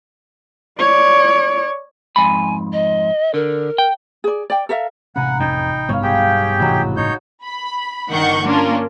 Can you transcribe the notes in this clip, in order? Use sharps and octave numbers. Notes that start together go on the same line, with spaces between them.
C#5 D5
F2 G#2 G#5 B5
D#5
D3 A#4
G5
G#4 D5
D5 G5
A4 A#4 E5 F5
A1 C3 C#4 F#5 G#5 A#5 B5
F2 D#4 G5
B1 G2 B3 C#5 F5
G4 G#4 G5 A5
A1 F2 G#2 C3 E3 F#3 G#3 B5
G1 A2 C#3 D#4 C#5 G6
B5
G1 D#3 D4 F#5 C#6 G6
A#3 C#4 D4 F4 A#4